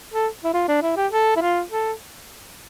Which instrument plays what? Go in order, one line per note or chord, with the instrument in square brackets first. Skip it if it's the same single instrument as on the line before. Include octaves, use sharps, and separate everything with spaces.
[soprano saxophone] A4
E4
F4
D4
E4
G4
A4
E4
F4
A4